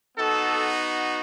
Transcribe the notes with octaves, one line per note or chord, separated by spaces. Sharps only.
B3 D#4 F#4 A4